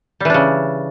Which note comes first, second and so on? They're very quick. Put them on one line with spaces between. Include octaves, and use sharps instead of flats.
G3 E3 D4 C#3